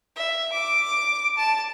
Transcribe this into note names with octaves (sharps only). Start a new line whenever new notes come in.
E5
D6
A5